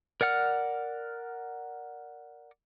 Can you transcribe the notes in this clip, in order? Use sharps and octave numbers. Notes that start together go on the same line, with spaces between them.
A#4 D5 F#5 F6